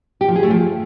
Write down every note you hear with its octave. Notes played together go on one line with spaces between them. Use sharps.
G4
F3
G#4
A3
F3